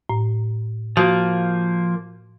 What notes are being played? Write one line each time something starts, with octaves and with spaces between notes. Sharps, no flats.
A2
F3 A#3 F#4